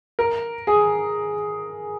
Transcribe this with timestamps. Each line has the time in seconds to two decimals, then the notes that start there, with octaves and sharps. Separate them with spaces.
0.19 A#4
0.67 G#4